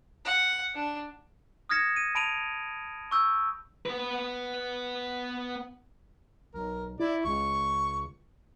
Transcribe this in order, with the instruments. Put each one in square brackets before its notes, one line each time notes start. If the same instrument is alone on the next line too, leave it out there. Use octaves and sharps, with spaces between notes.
[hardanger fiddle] F#5
D4
[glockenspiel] D#6 F6 G#6 A#6 C#7 E7
D#7
A5 B5 D7 D#7 F7
C#6 E6 G6
[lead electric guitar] B3 B4
[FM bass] B1 [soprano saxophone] A#4
[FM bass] E4 [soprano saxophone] D5
[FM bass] C#2 [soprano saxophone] C#6